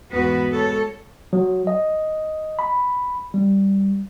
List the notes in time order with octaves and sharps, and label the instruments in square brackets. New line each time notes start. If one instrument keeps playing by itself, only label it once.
[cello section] E2 G#2 B3 F#4 B4
G#3 A4 C#5
[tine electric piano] F#3
D#5
B5
G3